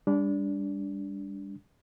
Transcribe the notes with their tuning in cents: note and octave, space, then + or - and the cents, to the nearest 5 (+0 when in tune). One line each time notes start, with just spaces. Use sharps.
G3 +35 D4 -20